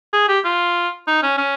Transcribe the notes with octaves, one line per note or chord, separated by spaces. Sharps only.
G#4
G4
F4
D#4
C#4
C#4